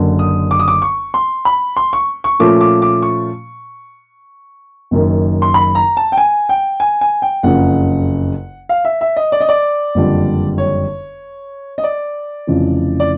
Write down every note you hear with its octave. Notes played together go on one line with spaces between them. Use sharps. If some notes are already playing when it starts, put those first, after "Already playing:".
Already playing: F#1 F#2 D3
D#6
D6
D#6
D6
C#6
C6
B5
C6
C#6
C#6
A#2 F3 A3 C#4 F4 D6
D6
D6
C#6
F#1 F#2 D#3
C6
B5
A#5
A5
G5
G#5
G5
G#5
G#5
G5
F#1 F2 C#3 F#5
F5
E5
E5
D#5
D5
D#5
D5
F#1 F2 D3 G3
C#5
D#5
D5
F1 F2 C#3 E3
D5